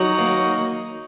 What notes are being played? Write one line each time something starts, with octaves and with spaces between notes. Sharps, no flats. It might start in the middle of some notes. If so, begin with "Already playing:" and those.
Already playing: F#3 D#4 F#4
A#3